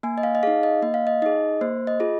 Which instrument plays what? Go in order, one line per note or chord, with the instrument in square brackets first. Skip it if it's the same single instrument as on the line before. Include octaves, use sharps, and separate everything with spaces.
[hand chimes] A#3 G#5
D#5
F5
D#5
D#4 G#4 F5
D#5
A#3 D#5
F5
D#5
D#4 G#4 D#5
A#3 C5
D#5
F4 G#4